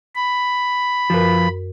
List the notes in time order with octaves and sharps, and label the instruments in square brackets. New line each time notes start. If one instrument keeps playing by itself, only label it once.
[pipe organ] B5
[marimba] F#2 A#4 [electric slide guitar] F3 F4 B4